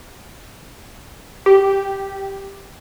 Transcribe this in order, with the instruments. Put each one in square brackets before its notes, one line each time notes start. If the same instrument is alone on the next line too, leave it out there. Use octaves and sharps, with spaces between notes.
[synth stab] G4